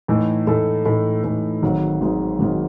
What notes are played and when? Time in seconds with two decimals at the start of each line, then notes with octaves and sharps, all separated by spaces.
0.08 A2 E3 A3 D#4 A4
0.47 A2 E3 A3 D#4 A4
0.85 A2 E3 A3 D#4 A4
1.23 A2 E3 A3 D#4 A4
1.63 G#1 G#2 D#3 F#3
2.01 G#1 G#2 D#3 F#3
2.39 G#1 G#2 D#3 F#3